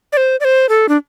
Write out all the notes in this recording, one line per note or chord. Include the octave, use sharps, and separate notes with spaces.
D5
C5
D5
C5
A4
D4